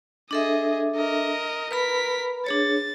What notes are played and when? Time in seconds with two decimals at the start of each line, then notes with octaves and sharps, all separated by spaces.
0.31 D4 G#4 A4 D#5 E5
0.96 A#4 D#5
1.71 A#4 B4 B5 B6
2.47 D4 G#4 C#5 A6